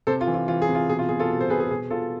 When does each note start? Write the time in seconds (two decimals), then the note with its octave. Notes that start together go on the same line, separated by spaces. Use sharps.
0.07 C3 A4 C5
0.21 F4
0.27 E3
0.34 F4
0.48 E3 F4
0.62 G#4
0.69 C3
0.75 F4
0.89 B2 G#4
0.99 F4
1.09 B2 G#4
1.20 F4 A4
1.30 B2
1.39 A4 C5
1.50 B2 G#4 B4
1.60 G#4
1.71 B2 G#4
1.90 B2 F4 A4